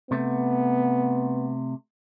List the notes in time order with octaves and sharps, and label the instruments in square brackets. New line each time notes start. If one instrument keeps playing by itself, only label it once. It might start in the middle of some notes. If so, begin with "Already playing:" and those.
[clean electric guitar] C3 A3 [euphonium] B3